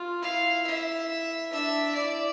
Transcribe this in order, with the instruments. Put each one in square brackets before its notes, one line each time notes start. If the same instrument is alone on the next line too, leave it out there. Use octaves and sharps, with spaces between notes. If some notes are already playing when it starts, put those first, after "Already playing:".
Already playing: [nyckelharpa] F4
[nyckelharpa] E4 [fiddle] F5
[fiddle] E5
[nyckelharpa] D4 [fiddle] E5
[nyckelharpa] E4 [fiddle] D5